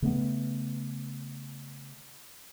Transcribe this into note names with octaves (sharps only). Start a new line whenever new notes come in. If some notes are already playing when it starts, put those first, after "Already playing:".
C#3 A3 B3